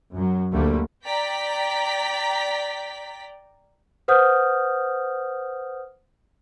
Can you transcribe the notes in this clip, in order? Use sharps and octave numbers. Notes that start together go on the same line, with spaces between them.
F#2 F#3
D2 D3 G3 A3 A#3
D5 G5 A#5 B6
B4 C5 F#5 D#6 F6 G6